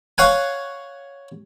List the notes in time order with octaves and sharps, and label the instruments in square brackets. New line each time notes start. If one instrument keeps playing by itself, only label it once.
[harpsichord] C#5 F5 F#5 G#5